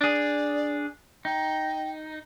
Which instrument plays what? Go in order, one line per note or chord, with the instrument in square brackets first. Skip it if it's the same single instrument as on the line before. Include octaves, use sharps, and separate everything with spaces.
[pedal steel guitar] D4 G#4 [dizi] D5
[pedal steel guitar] D#4 [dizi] G5